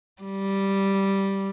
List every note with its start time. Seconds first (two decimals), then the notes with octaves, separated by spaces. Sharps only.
0.23 G3